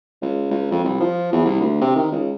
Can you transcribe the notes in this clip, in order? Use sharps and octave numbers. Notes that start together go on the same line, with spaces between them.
C#2
C#2
F2
C2
F3
E2
C2
D2
C3
D#3
C#2